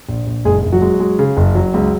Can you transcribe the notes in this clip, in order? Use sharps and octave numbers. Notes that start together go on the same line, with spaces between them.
A#1
A#1
F#1 G#3 G#4
F#1
F#3 F#4
G#3
G#3
C#3
F#1
F#3
C#2